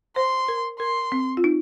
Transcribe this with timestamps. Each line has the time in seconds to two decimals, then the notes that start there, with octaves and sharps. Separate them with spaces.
0.16 C5 C6
0.48 A#4
0.80 A#4 C6
1.12 C4
1.37 F4
1.44 D#4